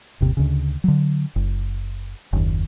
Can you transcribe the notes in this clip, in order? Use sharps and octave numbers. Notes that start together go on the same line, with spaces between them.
G1 D#2 C3
D2 C#3
D3 F#3
F#1
F#1 D#2